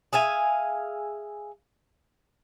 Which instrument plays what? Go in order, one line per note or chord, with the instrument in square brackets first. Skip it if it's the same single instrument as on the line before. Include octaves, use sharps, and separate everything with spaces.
[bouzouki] G#4 E5 F5 G#5